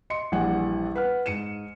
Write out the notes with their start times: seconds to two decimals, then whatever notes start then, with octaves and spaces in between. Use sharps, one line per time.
0.10 D#5 C6 C#7
0.32 A#1 E3 G3 F#5 G#5
0.95 B4 F#5 F6
1.26 G#2 C#7 D#7 E7